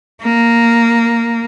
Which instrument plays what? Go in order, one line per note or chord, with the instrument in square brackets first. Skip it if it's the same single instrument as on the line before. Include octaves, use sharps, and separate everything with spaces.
[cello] A#3